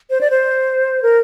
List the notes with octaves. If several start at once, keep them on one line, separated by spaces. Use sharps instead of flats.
C5
D5
C5
A#4